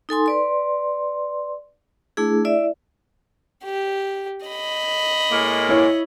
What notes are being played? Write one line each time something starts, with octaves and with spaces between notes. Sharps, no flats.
D#4 A4 G#5 C6
B4 D5 C6
A3 D4 E4 G#4
E4 D5 E5
G4
D#5 B5
A2 G#3 A#3
E4 C#5